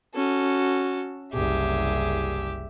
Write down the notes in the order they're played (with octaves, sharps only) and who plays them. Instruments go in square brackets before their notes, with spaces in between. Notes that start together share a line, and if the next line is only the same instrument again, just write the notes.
[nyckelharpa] C#4 F#4 [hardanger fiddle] A4
[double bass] F#1 C2 [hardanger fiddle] G4 E5 [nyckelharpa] G#4